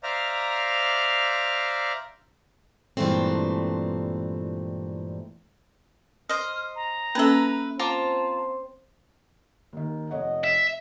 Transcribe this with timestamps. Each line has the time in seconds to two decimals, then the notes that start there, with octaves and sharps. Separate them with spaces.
0.03 C5 D5 E5 F5 A#5
2.97 G2 A#2 E3 G#3 A3 C4
6.29 C5 D#5 F6
6.76 A#5
7.15 A#3 C#4 A4 B4 E5
7.79 C4 F4 C5 A5 A#5 D6
9.73 D#2 D#3
10.11 F1 C#5 D#5 F#5
10.44 E5